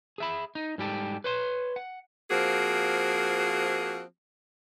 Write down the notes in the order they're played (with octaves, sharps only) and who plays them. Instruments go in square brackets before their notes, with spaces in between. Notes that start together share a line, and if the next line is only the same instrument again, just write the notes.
[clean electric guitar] G#4 E5 B5
D#4
G#2 G3 G4 A4
B4 C#5 C6
F#5
[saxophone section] F3 A#3 C4 F#4 G#4